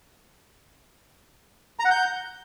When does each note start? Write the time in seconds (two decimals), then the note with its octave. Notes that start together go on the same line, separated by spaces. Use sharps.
1.79 A#5
1.85 F#5
1.90 G6